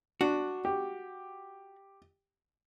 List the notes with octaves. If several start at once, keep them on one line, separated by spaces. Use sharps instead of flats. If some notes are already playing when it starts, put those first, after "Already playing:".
D4 F#4
G4